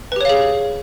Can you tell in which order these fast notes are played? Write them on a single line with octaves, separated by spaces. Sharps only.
B4 G4 C#5 F5 G#4